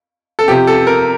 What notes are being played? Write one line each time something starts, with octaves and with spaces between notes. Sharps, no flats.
A4
C3 F3 G4
A4
A#4